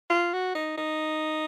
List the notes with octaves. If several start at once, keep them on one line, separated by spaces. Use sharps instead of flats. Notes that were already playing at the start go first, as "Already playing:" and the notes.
F4
F#4
D#4
D#4